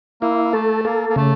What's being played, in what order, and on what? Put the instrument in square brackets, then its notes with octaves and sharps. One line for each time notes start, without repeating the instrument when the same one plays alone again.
[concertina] A#3 [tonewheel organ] E4
[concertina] A3 [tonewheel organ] A4
[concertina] A#3 [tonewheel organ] A4
[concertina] A#3
[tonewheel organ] C#3 [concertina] A3